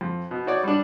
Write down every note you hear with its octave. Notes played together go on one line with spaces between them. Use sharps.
F2
B2
D#4 F#4 C#5 D5
G3 D4